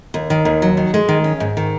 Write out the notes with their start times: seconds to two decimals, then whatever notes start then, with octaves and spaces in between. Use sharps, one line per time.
0.14 D#2
0.30 D#3
0.45 D#2
0.62 F#3
0.77 D#3
0.94 G#3
1.09 D#3
1.24 C#4
1.40 G#2
1.57 D#3